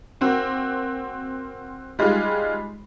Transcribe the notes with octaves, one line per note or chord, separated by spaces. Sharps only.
A#3 C4 F#4
G3 G#3 D#4 F4